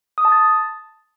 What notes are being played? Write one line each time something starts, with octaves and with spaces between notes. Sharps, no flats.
D#6
A5
A6